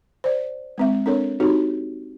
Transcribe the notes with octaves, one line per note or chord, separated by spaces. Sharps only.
C5 D5
G#3 C4 E5
C4 D4 A4 A#4 C#5
C4 D#4 F#4 G4 A4 C#5